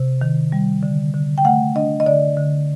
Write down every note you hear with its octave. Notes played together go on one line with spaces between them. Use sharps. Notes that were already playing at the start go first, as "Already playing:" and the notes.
Already playing: C3
D#3
G3
D3
D3
G5
A3 F#5
D4 D#5
D#5
D3 D5
D3